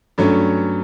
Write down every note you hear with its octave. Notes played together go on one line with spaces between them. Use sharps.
G2 F#3 A3 C#4